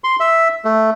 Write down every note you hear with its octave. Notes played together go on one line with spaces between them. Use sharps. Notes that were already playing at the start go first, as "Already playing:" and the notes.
C6
E5
A3